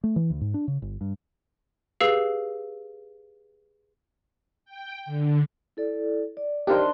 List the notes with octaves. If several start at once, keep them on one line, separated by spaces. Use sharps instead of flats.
A3
E3
D2
G#2
D4
C#3
G1
G2
G4 G#4 B4 F5 E6 C7
G5
D3
E4 A4 D5
D5
D4 D#4 G4 A#4 C5 C6